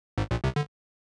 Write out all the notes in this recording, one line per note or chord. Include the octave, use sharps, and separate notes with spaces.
G#1 G#2
A#1 A#2
C2 C3
D3